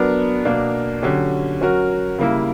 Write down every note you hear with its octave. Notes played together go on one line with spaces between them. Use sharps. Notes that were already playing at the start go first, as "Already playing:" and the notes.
Already playing: F#3 B3 D4 A#4
B2 A#3 D4 A#4
D3 F#3 C#4 G4
F#3 C#4 F#4 A#4
C#3 G3 A#3 E4